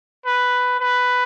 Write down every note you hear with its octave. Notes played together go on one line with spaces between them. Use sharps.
B4
B4